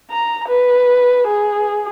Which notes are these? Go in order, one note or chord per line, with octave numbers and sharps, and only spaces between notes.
A#5
B4
G#4